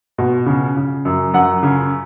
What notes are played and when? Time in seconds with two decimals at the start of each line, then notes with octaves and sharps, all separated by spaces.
0.18 B2
0.46 C#3
0.77 C#3
1.05 F#2
1.34 F#2 F#5
1.63 C#3